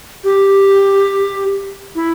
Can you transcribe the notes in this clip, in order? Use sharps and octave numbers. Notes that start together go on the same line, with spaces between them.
G4
E4